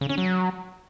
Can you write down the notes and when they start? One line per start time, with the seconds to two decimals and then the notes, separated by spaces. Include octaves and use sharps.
0.01 C#3
0.09 C#4
0.18 F#3